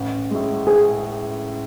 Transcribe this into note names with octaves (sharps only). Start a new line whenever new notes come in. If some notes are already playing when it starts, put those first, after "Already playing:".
Already playing: A1
A2 G#3
G#4